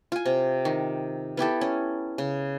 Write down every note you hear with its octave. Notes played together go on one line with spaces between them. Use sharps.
F4 G#5
C3
D#3
B3 E4 G4 A4
C#4
C#3